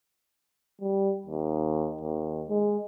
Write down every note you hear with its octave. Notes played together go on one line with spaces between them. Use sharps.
G3
D#2
D#2
G#3